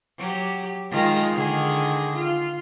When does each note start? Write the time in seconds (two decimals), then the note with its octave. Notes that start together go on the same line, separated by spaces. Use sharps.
0.18 F#3 G4
0.91 D#3 G#3 F4
1.34 D3 D#3 G#4
2.16 F4